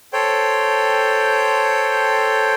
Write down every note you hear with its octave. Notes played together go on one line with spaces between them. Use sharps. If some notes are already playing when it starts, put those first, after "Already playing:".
A4 C5 C#5 G5